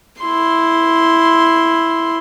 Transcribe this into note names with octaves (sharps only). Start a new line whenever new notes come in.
E4 C6